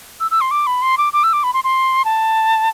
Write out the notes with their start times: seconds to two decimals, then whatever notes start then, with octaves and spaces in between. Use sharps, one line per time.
0.20 E6
0.31 E6
0.41 C6
0.51 D6
0.67 B5
0.82 C6
0.98 D6
1.13 D6
1.24 E6
1.33 D6
1.44 B5
1.54 C6
1.64 C6
2.05 A5